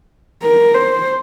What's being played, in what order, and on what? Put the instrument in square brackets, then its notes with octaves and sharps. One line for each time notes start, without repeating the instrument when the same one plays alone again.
[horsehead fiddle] A#4
C5